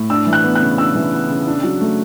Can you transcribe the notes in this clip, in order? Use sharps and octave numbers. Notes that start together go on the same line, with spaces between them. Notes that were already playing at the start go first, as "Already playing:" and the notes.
Already playing: A2
D4 E6
E3
F#6
B3
F#6
C#3
D4 E6
E3
B3
C#3
D4
F#3
A3